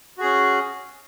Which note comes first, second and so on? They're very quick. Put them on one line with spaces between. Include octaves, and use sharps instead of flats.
F#4 G#4 C#4